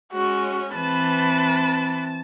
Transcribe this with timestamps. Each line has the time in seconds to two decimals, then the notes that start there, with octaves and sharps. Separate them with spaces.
0.13 G#3 C#4 F#4
0.75 E3 C4 B4 A5